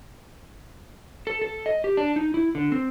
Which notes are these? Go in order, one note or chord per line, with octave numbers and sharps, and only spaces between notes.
A4
A4
D#5
G4
D4
D#4
E4
D3
C4